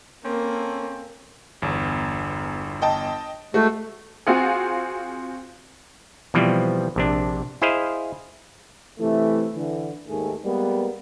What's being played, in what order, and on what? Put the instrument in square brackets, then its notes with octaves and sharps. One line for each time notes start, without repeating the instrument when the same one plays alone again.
[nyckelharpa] A#3 [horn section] C4 C#4 A4
[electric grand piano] G1 E2
[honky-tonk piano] D#5 G5 A5
[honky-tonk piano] G#3 [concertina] A3 [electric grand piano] F#4
[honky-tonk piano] C4 F4 F#4 G#4
[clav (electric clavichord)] B2 E3 F3 G3 C4
A#1 C3 D4
E4 G#4 C5 D#5 F5
[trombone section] C3 E3 A3
D3 E3
D#2 G#2 D#3 A3 G#4
G3 G#3 A#3 B3